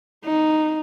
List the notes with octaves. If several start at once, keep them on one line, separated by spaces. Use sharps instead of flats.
D#4